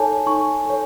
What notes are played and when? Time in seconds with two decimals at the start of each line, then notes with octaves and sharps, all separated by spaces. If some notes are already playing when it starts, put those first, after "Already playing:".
Already playing: D#4 A4 C#5 G#5 A5
0.27 D#4 C#6
0.66 A4 C#5